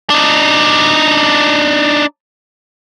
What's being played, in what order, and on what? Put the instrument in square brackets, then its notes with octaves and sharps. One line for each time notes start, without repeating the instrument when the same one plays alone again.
[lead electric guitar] D4 D#4